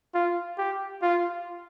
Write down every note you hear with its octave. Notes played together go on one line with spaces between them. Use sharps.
F4
G4
F4